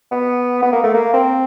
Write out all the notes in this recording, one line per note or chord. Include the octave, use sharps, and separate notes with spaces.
B3
B3
A#3
A3
A#3
C4